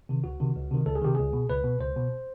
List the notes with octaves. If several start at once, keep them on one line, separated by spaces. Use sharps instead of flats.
C3 D#3
C#2 F#4
C3 D#3
C#2
C3 D#3
C#2 A4
G#4
C3 D#3 G4
C#2 G#4
B2
C#2 B4
B2
C#2 C5
B2